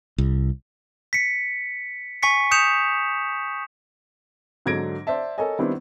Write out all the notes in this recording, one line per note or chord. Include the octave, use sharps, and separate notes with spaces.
C2
B6 C#7
G#5 C#6 B6 C#7
D#6 G6 C#7 E7 F7
G#2 D3 F#3 G#6 A#6 D7
C5 D5 E5 A5
A4 A#4 C#5 D#5 G#5
D#3 G3 B3 C4 D4 E4